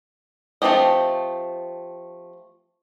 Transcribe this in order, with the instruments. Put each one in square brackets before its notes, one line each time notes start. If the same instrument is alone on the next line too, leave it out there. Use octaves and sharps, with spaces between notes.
[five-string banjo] F3 A3 C4 G4 D#5